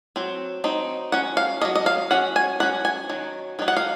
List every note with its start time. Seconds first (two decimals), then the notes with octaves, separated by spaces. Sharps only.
0.16 F#3 C4
0.64 F#3 C4 D#4
1.12 F#3 C#4 F#5
1.37 F5
1.61 C#4 D#5
1.65 F#3
1.75 D#5
1.86 F5
2.11 F#3 C#4 F#5
2.36 G#5
2.60 F#3 C#4 F#5
2.85 G#5
3.09 D#3 F#3
3.59 D#3 F#3 D#4
3.68 F#5
3.76 F5